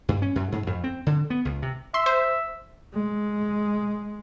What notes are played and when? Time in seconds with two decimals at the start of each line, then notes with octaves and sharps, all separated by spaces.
0.09 G2
0.22 C#4
0.36 F#2
0.52 G#2
0.67 F2
0.84 C4
1.06 D3
1.30 B3
1.45 C#2
1.62 C3
1.94 E5 C6
2.06 C5
2.94 G#3